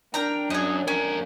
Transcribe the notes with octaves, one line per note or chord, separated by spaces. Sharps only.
D4 A#4 G5 A#5
F#2 G#4 D#5
F2 C#4 A#4